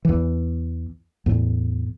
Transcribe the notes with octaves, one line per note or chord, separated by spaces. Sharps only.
E2 E3
E2 A2